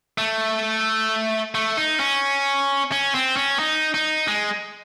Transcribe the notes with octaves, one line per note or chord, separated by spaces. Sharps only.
A3
A3
D#4
C#4
C#4
C4
C#4
D#4
D#4
G#3